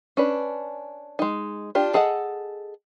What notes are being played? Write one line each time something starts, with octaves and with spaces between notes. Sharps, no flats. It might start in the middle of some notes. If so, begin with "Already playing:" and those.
C#4 D4 B4
G#3 D#4
D4 F4 G4
G#4 A4 D#5 F#5